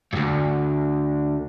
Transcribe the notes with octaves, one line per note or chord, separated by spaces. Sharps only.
D2 G2